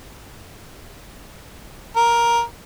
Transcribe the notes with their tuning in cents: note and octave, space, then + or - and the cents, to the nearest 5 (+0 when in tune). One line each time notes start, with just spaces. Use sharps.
A#4 +10